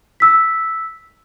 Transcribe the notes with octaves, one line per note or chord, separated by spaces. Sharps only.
E6 B6